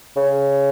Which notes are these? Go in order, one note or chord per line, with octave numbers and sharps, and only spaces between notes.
C#3